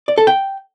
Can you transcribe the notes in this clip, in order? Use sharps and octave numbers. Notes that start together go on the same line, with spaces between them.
D5
A4
G5